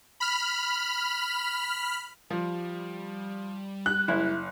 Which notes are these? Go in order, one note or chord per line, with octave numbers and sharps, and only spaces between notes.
B5 F6
F3 G3
F#6
F#1 E4